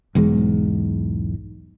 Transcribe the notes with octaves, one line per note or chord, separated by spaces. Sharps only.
B1 E2 G#2 G#3